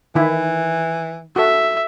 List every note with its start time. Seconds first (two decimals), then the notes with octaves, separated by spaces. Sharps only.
0.15 D#3 E3 E4
1.36 F#4 A4 E5